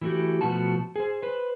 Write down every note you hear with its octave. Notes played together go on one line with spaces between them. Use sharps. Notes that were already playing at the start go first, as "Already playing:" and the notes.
E3 G3 A3 A#3 F#4 G4
B2 F3 A3 B3 F#4 A5
G#4 C5
B4 C5